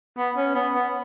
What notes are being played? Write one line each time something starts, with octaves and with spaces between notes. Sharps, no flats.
B3
C#4
B3
B3